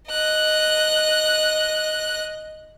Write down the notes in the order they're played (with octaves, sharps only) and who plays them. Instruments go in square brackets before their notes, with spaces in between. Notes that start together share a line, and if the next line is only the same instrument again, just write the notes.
[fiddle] D#5 F#6